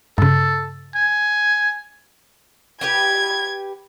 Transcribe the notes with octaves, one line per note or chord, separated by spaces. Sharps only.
G2 C#3 A4
G#5
G4 B4 G5 G#6